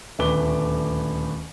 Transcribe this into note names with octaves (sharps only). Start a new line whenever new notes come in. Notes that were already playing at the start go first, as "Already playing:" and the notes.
D#1 D2 A3 B4 D6 G7